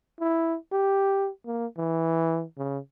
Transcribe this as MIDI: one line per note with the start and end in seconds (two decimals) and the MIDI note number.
0.20 0.56 64
0.72 1.29 67
1.46 1.66 58
1.78 2.44 52
2.58 2.78 49